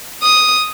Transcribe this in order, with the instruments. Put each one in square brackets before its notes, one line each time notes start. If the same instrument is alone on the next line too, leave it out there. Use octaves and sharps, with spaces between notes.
[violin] D#6